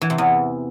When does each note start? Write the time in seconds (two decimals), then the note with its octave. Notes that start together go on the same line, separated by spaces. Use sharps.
0.02 E3
0.10 C3
0.18 E2